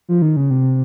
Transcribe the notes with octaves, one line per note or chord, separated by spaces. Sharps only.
F3
D#3
C#3
C3